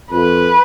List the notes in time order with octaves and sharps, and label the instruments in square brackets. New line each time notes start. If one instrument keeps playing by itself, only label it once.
[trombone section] F2 [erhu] B4